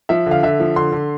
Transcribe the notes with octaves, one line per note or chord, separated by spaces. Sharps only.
F3 E5
D3
F5
D3 E5
F3
D3 C6
D3